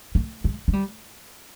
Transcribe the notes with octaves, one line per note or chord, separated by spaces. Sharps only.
A3
G#3
G#3
G3